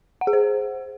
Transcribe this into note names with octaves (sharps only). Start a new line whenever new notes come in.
F#5
G#4
C5